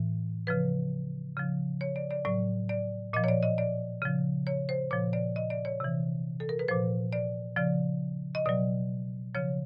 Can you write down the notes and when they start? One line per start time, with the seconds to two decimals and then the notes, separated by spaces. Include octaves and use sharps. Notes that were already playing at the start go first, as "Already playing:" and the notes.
Already playing: A2 E3
0.47 C#3 F3 B4
1.37 C#3 F3
1.81 C#5
1.96 D5
2.11 D5
2.25 A2 F#3 D5
2.69 D5
3.13 A#2 D#5
3.17 F3
3.24 C#5
3.28 D5
3.43 D#5
3.58 D5
4.02 C#3 F3
4.47 C#5
4.69 C5
4.91 A#2 F3 C#5
5.13 D5
5.36 D#5
5.50 D5
5.65 C#5
5.80 C3 E3
6.40 A4
6.49 A#4
6.59 B4
6.68 A#2 F3 C5
7.13 D5
7.57 C#3 F3 D5
8.35 D#5
8.46 B2 F#3 D5
9.35 C#3 F3 C#5